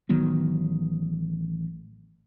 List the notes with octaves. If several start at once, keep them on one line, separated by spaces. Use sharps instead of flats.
A1 D#3 F#3 B3